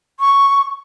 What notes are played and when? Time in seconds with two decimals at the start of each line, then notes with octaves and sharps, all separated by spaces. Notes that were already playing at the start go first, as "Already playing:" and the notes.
0.20 C#6